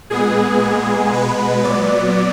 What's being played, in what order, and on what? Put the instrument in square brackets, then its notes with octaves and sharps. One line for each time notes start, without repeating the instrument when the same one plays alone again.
[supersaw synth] A#2 G#3 B3 G#4
A#2 G#3 B3 G#4
B2 G#3 B3 B4
A#2 F#3 B3 D5